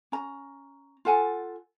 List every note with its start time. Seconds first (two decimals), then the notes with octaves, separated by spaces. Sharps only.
0.12 C#4 A#5
1.05 F4 A4 F#5 G#5